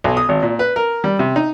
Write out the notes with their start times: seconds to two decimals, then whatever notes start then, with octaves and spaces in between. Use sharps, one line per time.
0.04 B1
0.17 D#6
0.29 G#1
0.42 A#2
0.59 B4
0.76 A#4
1.04 G3
1.19 C3
1.36 D#4